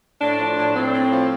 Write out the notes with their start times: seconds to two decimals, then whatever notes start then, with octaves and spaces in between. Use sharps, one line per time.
0.21 A2 D4
0.39 F3
0.57 A2
0.75 A2 C4
0.93 A2
1.11 F3